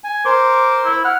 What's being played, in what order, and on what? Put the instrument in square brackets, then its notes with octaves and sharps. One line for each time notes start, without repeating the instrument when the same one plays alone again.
[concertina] G#5
[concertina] A#4 C5 C6 [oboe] D6
[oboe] E4
[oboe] F#5 [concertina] F6